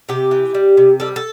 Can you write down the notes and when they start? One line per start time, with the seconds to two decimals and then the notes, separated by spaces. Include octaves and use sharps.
0.09 C3 G4
0.31 E3
0.54 G3
0.77 C3
1.00 G3 A4
1.16 A4